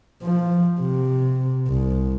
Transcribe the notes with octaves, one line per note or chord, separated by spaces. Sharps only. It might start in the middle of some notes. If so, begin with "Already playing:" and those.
F3
C3
C2